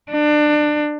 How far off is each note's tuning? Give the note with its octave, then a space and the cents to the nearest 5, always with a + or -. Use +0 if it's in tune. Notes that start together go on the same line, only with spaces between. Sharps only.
D4 +25